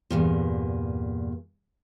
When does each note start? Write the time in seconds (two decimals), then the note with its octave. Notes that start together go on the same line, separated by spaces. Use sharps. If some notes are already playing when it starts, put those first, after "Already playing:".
0.10 E2 G2 A#2